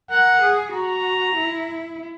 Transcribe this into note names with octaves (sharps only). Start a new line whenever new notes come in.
A#4 F#5
G#4
F#4 A#5
E4